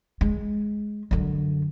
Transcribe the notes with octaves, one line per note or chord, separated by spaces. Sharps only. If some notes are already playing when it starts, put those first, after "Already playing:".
G#3
F#2 D3